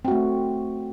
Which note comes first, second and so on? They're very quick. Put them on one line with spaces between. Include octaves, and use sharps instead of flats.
C4 F#4 A3